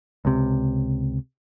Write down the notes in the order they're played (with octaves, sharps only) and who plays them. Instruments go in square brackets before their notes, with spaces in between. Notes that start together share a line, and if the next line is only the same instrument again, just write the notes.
[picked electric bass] C#2 C3